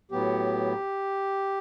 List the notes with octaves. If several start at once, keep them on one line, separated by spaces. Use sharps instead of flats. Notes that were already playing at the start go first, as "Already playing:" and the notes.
A2 F#3 B3 G4